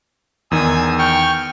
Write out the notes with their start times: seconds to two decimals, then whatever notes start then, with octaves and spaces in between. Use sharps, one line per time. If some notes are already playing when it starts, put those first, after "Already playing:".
0.51 E2 D#3 G#5 D#6 E6
0.99 G5 C#6 F6